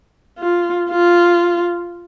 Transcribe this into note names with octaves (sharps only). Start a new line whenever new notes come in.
F4
F4